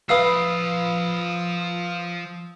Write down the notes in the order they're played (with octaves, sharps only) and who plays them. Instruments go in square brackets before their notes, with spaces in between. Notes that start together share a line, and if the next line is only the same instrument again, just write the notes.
[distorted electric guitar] F3 B5 [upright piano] B4 F5 C7 [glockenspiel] D#6 E6